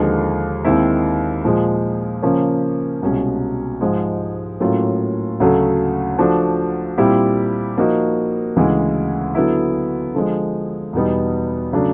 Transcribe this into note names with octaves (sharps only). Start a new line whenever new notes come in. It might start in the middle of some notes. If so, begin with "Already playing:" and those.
Already playing: D#2 D3 F3 G#3
D#2 D#3 G#3 C4 E4
A#2 F3 G#3
C#3 F3 A#3 C#4
C2 B2 G#3 C#4
G#2 F3 G#3
A2 F#3 A#3 C#4 F4
D2 C#3 F#3 A3
F3 A3 D4 F#4
A#2 G3 C4 E4 G4
F3 A#3 D#4 F#4
D2 C#3 E3 G#3
D3 F#3 B3 E4
D3 F3 G#3
E2 B2 G3 B3 D#4
C#3 F#3 A3 D4